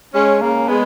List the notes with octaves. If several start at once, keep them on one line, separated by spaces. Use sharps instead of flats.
G#3 C#4
C#3 A#3
G#3 B3